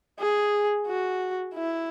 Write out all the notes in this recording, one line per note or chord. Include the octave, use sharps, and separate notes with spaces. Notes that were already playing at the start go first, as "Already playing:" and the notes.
G#4
F#4
E4